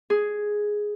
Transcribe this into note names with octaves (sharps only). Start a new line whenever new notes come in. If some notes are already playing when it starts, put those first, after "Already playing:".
G#4